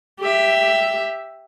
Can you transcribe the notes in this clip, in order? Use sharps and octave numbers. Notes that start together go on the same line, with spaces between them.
G4 E5